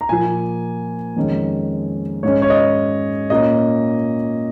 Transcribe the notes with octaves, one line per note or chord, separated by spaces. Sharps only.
A#5
A#2 F3 A#3 G#5
F2 D#3 G#3 C#4
G#2 G#3 C#4 C#5
C#5
D#5
A#2 A#3 C#4 D#5